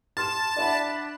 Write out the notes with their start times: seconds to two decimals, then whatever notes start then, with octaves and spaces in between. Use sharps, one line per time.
0.17 A5 C6 F6
0.57 D4 D5 E5 F#5 B5